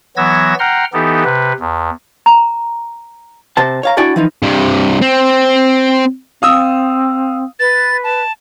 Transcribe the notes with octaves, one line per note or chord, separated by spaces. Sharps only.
E3 F#3 B3 E6 G#6 A#6
F#5 G5 A#5 C6 F6
E3 B3 D#4 G4 A4
C3 B4
E2
A#5
C3 C5 A5
C#5 F5 A#5
D4 E4 F#4 D5 G5 G#5
E3 F3 D#4
G2 C3
C4
C4 F5 D#6 E6
B4 A6
A5